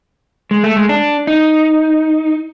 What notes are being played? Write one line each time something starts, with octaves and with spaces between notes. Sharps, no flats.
G#3
A3
G#3
D4
D#4